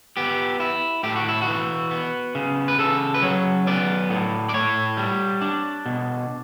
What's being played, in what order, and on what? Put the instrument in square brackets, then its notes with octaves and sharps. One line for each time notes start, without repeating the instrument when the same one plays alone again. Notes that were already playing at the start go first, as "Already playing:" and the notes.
[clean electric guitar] B3 G4
E4
A2 G4
F#4
E4
F#4
E3
B3
C#3
B4
C#3 A4
B4
F#3 C#5
B3 D5
A2
D5
A2 C#5
G3
D4
B2